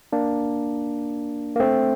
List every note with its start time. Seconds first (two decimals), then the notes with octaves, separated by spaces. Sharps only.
0.12 A#3 D4
1.56 A#3
1.60 A3 C4